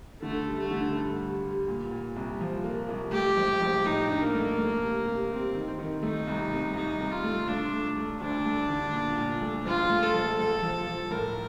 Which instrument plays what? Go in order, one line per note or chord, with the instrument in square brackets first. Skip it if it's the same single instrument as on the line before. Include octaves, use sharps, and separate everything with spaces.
[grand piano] D3 [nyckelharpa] A3
[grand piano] G3
[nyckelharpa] A3
[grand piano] D3
G2
G3
G3
A#2
A#2
C2
F3
A#3
C2
[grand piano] A3 [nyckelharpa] G4
[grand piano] A#1
A#1
[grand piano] A2 [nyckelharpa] D#4
[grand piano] D4
[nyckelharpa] A#3
[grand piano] A3
A3
C3
C3
[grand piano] C3 [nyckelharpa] C4
[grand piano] D#3
D#3
[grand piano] A3 [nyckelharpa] D#4
[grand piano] C2
C2
[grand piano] C2 [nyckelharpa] D#4
[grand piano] C2
[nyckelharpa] F4
[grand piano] A3
[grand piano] A3 [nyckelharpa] D4
[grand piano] A3
A3
[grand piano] D2 [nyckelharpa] D4
[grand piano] A3
D3
A#2
A#2
A3
[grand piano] A#1 [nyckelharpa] F4
[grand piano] A3
[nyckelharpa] A4
[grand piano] A#1
[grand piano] A#1 [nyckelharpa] A4
[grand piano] F3
F3
[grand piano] A2 [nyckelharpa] A#4